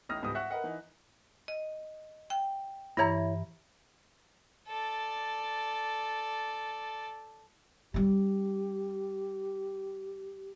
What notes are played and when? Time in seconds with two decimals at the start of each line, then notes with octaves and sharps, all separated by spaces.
0.09 A1 A2 D#4 D#6 F6 A#6
0.22 C#2 G#2 G3 B3 D#6
0.35 E5 F#5 C#6 F#6
0.51 A#4 B4 D#5 F#5
0.64 E3 D#4
1.48 D#5
2.30 G5
2.97 G2 E3 E4 C#5 A#5
4.68 A4 D5
7.94 G3 C#4 G4